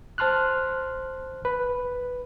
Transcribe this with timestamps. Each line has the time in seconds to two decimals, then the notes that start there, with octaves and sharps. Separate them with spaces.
0.18 C5 A5 C6 F6 F#6
1.45 B4